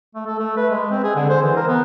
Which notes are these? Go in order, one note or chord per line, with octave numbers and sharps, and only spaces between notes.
A3
A4
A3
B4
G#3
C4
G#4
D3
C5
E3
A#4
B3